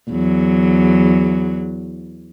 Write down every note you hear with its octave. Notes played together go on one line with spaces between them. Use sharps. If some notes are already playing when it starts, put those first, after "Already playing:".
E2 F#3